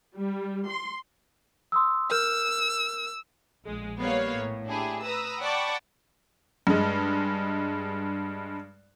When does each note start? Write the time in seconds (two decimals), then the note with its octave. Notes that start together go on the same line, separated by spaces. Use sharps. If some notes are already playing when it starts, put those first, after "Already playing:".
0.17 G3
0.67 C6
1.72 C6 D#6 E6
2.11 A#4 E6 F6 G6
3.65 A#1 G#3
3.98 G3 A#3 B3 C#5 F5
4.34 A2
4.66 D4 E4 G4 G#4
5.03 B4 A#5 D#6 E6
5.40 D5 F#5 G5 A5 B5 C#6
6.67 G2 G#3